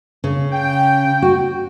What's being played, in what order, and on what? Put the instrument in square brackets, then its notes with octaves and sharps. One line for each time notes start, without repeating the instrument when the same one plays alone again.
[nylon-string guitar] C#3
[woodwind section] G5
[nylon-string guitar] F#4